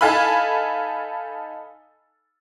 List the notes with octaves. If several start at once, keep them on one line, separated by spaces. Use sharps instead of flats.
D#4 A4 F5 G#5 B5